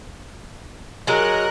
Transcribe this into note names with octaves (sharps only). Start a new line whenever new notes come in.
F#3 G#3 A#4 F#6